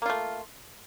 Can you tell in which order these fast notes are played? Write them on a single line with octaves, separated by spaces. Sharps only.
A#3 F4 A3